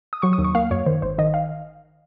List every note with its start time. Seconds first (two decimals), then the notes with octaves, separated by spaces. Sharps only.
0.13 D#6
0.22 F#3 C#6
0.33 D#6
0.38 D#2
0.44 C#6
0.55 A#3 F5
0.71 F#2 C#5
0.86 D#3 C5
1.02 G#1 C5
1.18 D#3 D#5
1.34 F5